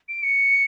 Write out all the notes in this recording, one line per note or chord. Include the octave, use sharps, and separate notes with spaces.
D7
C#7